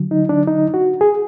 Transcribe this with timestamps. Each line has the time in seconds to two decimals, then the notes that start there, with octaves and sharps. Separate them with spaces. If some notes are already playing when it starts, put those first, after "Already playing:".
Already playing: D3 F#3
0.11 D#4
0.29 D4
0.47 D#4
0.74 F#4
1.01 G#4